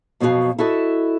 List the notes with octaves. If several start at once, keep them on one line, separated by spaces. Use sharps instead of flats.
F2 B2 F#3 A#3 F#4 F5
E4 F#4 A4 D#5